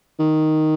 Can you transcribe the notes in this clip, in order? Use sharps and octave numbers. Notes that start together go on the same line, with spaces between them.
D#3